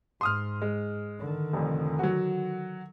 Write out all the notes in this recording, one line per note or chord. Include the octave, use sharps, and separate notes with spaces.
G#2 C6 D#6 F6
G#3
D3 D#3
F1 F2
F#3 F#4